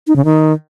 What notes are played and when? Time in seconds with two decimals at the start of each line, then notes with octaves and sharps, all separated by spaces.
0.07 D#4
0.16 C#3
0.25 D#3